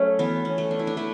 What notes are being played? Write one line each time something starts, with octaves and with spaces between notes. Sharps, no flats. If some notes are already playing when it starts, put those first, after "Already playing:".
Already playing: F#3 A3 C#4
E3 B3
C#4
A3
D4
E4
D4
A3 E4